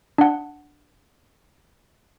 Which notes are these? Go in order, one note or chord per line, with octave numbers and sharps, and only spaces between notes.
D4 F#5